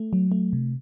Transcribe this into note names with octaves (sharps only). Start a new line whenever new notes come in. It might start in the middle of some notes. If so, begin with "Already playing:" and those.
Already playing: A3
F#3
A3
C3